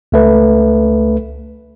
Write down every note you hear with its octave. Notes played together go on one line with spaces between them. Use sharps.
C#2 A3 B4